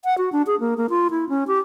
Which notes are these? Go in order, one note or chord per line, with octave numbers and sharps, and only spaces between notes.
F#5
F#4
D4
G#4
A#3
A#3
F4
E4
C#4
G4